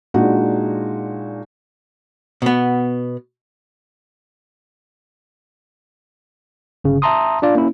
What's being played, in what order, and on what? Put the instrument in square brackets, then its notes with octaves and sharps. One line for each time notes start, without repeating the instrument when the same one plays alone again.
[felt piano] A#2 G#3 D4 D#4 F#4
[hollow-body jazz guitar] B2 B3
[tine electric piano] G1 C#3
E5 A5 A#5 C6 D#6
D4 F4 D5 F5
A#3 C#4 E4